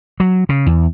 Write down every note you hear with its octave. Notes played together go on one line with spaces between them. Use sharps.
F#3
C#3
E2